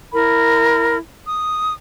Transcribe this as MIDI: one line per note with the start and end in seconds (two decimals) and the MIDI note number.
0.13 0.98 64
0.13 0.98 70
0.13 0.98 83
1.26 1.74 87